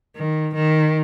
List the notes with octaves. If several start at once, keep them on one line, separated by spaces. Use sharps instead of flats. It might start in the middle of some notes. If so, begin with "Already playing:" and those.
D#3
D#3